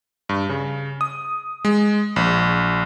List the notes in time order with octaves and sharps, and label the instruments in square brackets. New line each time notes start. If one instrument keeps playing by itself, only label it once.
[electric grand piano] G2
C#3
D#6
G#3
A#1